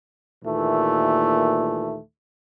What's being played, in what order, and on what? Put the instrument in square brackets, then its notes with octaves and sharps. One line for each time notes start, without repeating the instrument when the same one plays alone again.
[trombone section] D#2 A#2 E3 A3